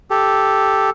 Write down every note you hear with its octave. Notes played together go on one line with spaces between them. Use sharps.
G4 A4